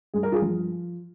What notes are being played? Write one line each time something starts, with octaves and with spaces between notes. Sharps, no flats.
G2 G#4
A#4
F4 G#4
F3